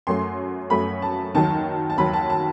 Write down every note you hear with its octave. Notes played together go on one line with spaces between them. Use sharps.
F#2 F#3 A3 C6
F#2 F#3 A3 B5
A5
D#2 D#3 F#3 A5
A5
D#2 D#3 F#3 B5
A5
A5